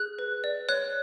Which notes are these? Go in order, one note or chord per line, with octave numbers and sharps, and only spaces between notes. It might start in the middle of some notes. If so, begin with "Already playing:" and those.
Already playing: G#4 F#6
B4
D5
C#5 F#6